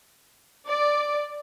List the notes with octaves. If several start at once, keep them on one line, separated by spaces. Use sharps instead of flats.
D5